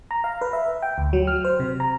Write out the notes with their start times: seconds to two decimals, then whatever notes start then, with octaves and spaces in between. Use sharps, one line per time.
0.11 A#5
0.24 F5
0.41 B4
0.53 E5
0.82 G5
0.98 D2
1.13 F#3
1.27 F6
1.45 C5
1.60 C3
1.80 A#5